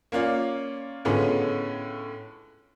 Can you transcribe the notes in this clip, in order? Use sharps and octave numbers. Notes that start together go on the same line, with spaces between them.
A#3 C#4 F4 D5
A2 D3 G#3 B3 C#4 F4